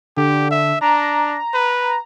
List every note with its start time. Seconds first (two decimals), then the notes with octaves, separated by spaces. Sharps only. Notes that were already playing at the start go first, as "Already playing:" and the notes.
0.17 D3 G4
0.51 E5
0.81 D4 A#5
1.54 B4